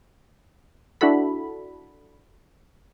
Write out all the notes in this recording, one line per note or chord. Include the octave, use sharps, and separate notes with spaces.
D4 E4 F#4 A4 B5